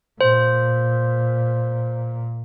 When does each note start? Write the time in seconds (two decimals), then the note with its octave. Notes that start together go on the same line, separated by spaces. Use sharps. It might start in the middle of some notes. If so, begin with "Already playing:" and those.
0.21 A#2 C5